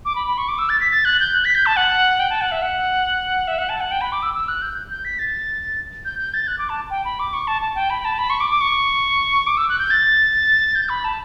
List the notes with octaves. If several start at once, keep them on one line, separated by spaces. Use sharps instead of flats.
D6
B5
B5
C#6
D6
E6
A6
B6
A6
F#6
G6
F#6
B6
G6
A5
F#5
G5
A5
F#5
E5
F#5
E5
F#5
A5
F#5
G5
B5
D6
E6
E6
F#6
G6
G6
B6
A6
G6
G6
A6
F#6
D6
A5
G5
B5
D6
C#6
A5
A5
G5
B5
A5
B5
C#6
D6
D6
C#6
D6
E6
F#6
G6
A6
G6
B5
A5